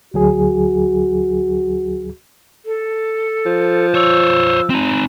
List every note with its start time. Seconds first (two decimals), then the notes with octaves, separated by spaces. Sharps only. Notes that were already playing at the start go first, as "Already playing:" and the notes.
0.14 D2 F#3 F#4 G#4
2.65 A4
3.46 F3
3.94 C5 C#5 E6
4.70 C4 D#4